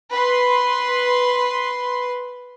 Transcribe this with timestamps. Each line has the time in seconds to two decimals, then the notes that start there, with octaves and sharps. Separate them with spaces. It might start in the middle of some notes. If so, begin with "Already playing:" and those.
0.13 B4 C6